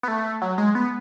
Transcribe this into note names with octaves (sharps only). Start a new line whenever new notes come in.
B3
A3
F#3
G#3
B3